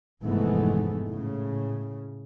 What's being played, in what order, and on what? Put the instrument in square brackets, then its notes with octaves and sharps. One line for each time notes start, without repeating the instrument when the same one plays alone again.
[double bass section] F1 G#2 E3 G#3 A3 B3
A2 C#3